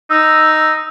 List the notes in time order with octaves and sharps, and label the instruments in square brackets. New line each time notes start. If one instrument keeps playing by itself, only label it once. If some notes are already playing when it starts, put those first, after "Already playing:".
[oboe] D#4 [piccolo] E6